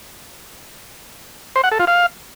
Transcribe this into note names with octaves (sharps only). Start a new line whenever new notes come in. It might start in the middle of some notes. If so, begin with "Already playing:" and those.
C5
F#5
A4
F4
F5